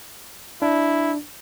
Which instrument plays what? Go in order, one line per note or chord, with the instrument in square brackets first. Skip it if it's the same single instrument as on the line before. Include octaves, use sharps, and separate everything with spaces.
[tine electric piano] D4 [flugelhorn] E4